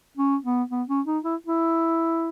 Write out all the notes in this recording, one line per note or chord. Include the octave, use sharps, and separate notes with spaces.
C#4
B3
B3
C#4
D#4
E4
E4